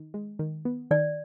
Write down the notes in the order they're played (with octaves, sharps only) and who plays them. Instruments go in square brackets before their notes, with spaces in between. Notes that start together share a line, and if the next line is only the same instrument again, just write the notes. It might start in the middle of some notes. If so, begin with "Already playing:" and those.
Already playing: [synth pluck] D#3
G#3
D#3
B3
[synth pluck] D#3 [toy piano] D5